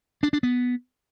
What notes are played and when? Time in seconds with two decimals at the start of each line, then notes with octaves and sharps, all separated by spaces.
0.23 D4
0.33 D4
0.43 B3